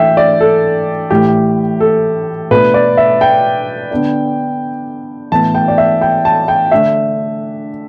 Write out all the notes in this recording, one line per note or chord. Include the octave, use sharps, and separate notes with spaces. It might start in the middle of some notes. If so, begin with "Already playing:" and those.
Already playing: E3 A3 D4 E5 G5
D5
A4
A2 E3 A3 G4
A4
B2 A3 D4 B4
D5
E5
G5
D3 B3 D4
A2 E3 B3 A5
G5
D5
E5
G5
A5
G5
D3 A3 D4 E5